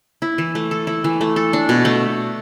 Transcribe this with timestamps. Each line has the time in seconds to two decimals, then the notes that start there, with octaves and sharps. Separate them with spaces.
0.22 E4
0.38 E3
0.55 A3
0.71 A4
0.87 E4
1.04 E3
1.21 A3
1.36 A4
1.53 D4
1.69 B2
1.85 A3